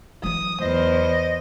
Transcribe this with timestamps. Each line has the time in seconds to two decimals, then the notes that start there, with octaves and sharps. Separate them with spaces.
0.24 E3 F#3 D#6
0.62 E2 C5 D#5